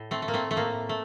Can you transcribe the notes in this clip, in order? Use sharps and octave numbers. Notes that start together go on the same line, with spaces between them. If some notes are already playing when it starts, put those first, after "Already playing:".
Already playing: A2
A3 C4
A3
A#3
A3 C4
A3
A2 A#3
A3